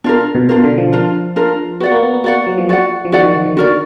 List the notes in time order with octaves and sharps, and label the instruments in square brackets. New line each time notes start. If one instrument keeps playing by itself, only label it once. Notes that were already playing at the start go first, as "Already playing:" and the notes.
[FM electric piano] B2 [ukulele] D4 F4 A#4
[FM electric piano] B2
[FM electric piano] B2 [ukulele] D4 F4 A#4
[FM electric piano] D3
F3
[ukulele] D4 F4 A#4
D4 F4 A#4
[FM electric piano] B3 [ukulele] F#4
[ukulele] D5 F#5
[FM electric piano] A#3
B3
B3
[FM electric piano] A#3 [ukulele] F#4 D5 F#5
[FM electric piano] F#3
F3
[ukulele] F#4 D5 F#5
[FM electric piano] F3
[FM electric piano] D#3 [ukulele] F#4 D5 F#5
[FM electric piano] D#3
F3
D#3
[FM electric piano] D3 [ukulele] F#4 A#4 D5